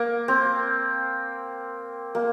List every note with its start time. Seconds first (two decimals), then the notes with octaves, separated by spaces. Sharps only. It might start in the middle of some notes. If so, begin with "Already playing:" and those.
Already playing: A#3
0.28 C4
2.15 A#3